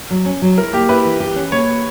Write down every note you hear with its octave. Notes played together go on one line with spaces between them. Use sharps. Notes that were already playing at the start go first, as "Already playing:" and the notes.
F#3
C#4
F#3
E4 A#4
A#3 G4
E4 B4
E3
G4
C#4
A#3 C#5